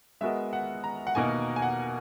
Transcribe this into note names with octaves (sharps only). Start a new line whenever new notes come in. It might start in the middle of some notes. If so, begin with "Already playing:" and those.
G#3 B3 F#4 A#4 D#5 E5
F#5
A#5
F#5
B2 A#3 D#4 A#4 G#5
G#5
F#5